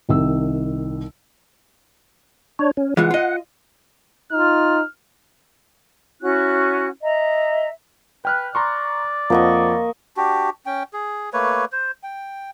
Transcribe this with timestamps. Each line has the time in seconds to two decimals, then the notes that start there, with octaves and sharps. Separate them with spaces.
0.09 C2 D#3 E6
2.59 D4 C#5
2.77 C#4
2.97 E3 G#3 F4 F#5
3.11 F4 D#5
4.32 D#4 F4 F6
6.21 C#4 E4 F#4 F#6
7.01 D#5 E5 A#5
8.25 B4 G5 F6 F#6
8.55 D5 A#5 C6 C#6
9.30 F2 F3 A#3 D#5 F#5 C#6
10.17 D4 F#4 G4
10.66 C#4 G5
10.93 G#4
11.33 A3 A#3 B4 C#5
11.72 C5
12.03 G5